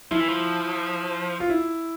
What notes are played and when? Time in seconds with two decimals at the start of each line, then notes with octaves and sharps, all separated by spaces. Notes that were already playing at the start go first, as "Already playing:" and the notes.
0.11 F3 E4
0.20 E3
0.28 F3
1.40 F4
1.49 E4